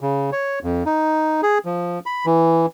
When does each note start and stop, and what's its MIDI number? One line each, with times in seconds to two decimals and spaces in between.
0.01 0.30 49
0.32 0.59 73
0.63 0.83 41
0.86 1.41 63
1.43 1.58 68
1.65 2.00 53
2.06 2.26 83
2.26 2.66 52